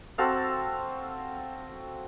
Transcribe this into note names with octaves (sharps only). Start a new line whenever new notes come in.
C4 F#4 A4 F5